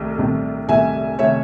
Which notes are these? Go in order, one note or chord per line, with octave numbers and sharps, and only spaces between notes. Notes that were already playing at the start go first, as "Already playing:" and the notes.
Already playing: C2 C3 D#3 A3
C2 C3 D#3 A3
C2 C3 D#3 A3 E5 G#5
C3 D#3 A3 C#5 E5